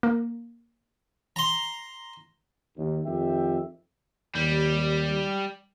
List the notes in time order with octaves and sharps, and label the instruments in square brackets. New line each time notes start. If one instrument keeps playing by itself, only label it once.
[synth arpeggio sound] A#3
[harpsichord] A#5 C6
[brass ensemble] D#2
F2 D#3 G4 E5 G5
[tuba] D#2 [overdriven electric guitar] G3